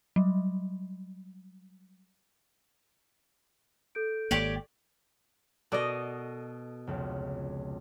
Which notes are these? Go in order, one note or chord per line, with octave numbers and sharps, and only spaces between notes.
F#3 G3
A4 G6 D7
G#1 A#3 G4 C#5 D5
B2 F#4 A4 A#4 D5 D#5
F1 C#2